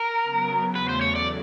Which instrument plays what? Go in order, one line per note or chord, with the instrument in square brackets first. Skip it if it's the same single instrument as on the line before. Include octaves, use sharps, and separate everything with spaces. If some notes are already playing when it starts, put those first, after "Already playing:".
Already playing: [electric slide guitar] A#4
[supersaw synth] C#3 F#3 B3
[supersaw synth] E2 C#3 F#3 A3 [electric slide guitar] B4
[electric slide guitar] C5
C#5
D5